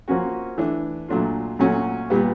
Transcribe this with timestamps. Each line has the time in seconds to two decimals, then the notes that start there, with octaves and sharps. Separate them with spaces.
0.08 F3 A#3 C#4 F#4
0.58 E3 A3 D4
1.09 A#2 F#3 A3 D4 F4
1.59 A#2 F#3 A3 C#4 F#4
2.10 A#2 G3 B3